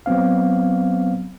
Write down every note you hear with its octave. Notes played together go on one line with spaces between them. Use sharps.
F#3 B3 C4 F5